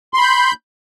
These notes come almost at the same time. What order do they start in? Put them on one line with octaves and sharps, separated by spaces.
C6 B5 G6